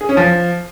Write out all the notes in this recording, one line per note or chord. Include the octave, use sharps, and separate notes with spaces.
G#4
C#4
F3